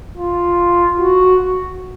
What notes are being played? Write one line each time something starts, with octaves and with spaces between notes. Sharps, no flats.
F4
F#4